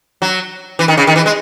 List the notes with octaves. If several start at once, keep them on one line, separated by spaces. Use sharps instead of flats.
F#3
E3
D#3
C#3
D#3
E3
G#3